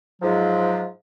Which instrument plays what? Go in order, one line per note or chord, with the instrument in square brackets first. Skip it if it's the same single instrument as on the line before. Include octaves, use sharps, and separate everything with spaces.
[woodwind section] G#2 F3 F#3